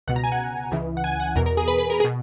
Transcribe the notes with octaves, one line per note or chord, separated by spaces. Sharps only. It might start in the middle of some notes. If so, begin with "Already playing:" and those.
C#2 B2 F#5
A#5
G#5
F#5
C#2 C#3 E3
F#5
G#5
F#5
E2 B2 A#4
A#4
G#4
B4
B4
A#4
G#4
B2